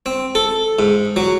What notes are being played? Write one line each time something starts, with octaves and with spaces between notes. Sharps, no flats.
C4
A4
G#2
F#3